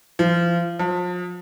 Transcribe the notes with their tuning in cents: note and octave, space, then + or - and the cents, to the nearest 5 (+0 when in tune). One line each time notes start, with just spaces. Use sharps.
F3 -30
F3 +35